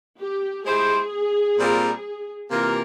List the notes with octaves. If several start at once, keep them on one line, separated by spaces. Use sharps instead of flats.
G4
G#3 E4 G4 G#4 C5
A#2 G3 C4 F4 A#4
C3 E3 A#3 F4 G4 A#4